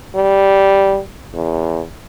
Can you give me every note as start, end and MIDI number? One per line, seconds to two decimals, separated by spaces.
0.16 0.99 55
1.35 1.81 40